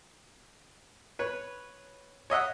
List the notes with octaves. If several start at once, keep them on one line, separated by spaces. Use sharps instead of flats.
B4 C#5
C#5 D#5 E5 F#5